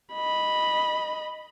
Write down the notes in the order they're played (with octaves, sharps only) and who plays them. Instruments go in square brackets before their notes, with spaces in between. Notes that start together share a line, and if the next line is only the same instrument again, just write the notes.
[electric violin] D#5 B5